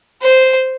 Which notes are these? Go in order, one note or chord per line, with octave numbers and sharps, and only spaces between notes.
C5